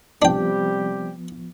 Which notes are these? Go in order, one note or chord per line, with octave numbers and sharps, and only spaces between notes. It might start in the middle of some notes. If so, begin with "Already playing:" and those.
C3 F3 G3 B3 D4 G4 G5